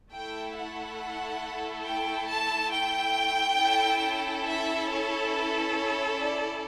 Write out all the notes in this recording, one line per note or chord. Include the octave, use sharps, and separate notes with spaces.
A3 E4 A4 G5
F#5
G5
A5
G5
C#4 E4 A4
E5
C#5
B4
C#5
D5